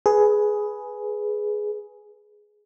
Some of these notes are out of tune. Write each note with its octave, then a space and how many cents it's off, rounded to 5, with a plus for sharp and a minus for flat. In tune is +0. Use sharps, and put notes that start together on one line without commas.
G#4 +10 B4 +0